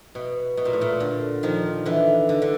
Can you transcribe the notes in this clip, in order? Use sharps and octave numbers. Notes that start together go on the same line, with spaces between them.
B2
B2
A#2
A2
A#2
D3
D#3 F3
D3 E3
D3
D3